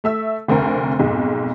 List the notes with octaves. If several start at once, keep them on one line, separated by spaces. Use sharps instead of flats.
A3 E5 E6
F1 D2 C4 A#4
B1 F2 G#2